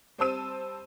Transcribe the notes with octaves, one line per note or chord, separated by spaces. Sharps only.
G3 C4 C5 A5 E6 D#7